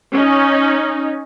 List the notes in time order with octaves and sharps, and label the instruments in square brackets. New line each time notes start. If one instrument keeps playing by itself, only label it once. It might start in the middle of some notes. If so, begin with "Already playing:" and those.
[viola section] C#4 D#4